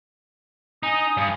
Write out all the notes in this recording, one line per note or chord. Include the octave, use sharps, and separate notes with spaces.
D#4 G#5 D#6
G2